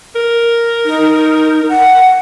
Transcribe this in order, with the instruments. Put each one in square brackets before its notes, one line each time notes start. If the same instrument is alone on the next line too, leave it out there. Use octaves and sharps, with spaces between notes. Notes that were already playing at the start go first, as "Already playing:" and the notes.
[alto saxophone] A#4
[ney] D#4
F#5